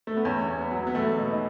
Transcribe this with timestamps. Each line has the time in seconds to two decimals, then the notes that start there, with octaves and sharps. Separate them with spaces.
0.07 A3
0.17 B3
0.25 E2 C#4
0.48 E2
0.60 B3
0.71 F#3
0.87 B3
0.95 E2 A3
1.18 B2
1.30 D#4